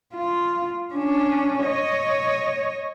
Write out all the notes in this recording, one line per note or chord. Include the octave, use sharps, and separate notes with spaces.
F4
C#4 D4
C#5 D#5